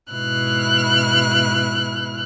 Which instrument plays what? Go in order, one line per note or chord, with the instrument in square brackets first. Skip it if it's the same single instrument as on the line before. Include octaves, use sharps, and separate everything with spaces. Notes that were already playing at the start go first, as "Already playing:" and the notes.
[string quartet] G#2 B2 E4 F6 F#6